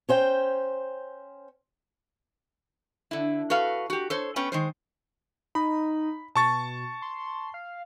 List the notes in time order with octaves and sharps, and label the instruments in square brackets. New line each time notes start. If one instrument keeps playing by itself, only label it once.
[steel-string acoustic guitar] C#4 C5 G5
[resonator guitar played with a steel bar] D3 E4
F#4 A4 B4 F5
F#4 G4
A4 C5 C#5
B3 C#4 B4 G5
D#3 G#3 C5
[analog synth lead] D#4 [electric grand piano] B5
[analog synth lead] B2 [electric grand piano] A5 C#6 A6
[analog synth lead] C6
F5